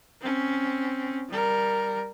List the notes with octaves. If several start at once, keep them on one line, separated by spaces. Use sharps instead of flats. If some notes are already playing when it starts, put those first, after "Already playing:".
C4 C#4
G3 A#4